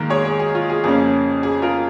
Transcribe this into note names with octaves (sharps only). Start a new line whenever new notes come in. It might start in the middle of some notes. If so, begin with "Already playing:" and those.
Already playing: G#2 D#3 A#3 A#4
G#4 C#5
G#4
G#4
F4
G#4
F2 C#3 A#3 C#4 G#4
G#4
F4 A#4